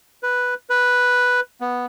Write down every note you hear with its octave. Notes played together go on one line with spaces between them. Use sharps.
B4
B4
B3